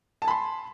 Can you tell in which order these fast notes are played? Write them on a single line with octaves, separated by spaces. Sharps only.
A5 G#5 B5 C6